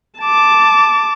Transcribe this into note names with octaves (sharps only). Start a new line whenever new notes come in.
A5 D6